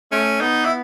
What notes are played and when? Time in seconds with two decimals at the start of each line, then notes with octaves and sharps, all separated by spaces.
0.12 A3 C#4
0.41 B3 D#4
0.65 E4